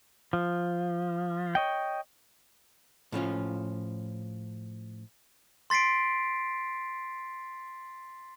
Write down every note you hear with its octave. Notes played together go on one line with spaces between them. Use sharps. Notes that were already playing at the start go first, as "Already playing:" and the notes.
F3
C#5 D#5 G5
A2 F3 C#4 F4
C6 A6 B6 C7 D7